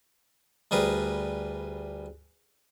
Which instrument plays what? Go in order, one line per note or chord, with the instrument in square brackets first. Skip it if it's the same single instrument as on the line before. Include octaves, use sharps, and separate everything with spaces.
[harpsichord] D2 G3 G#4 A#4 B4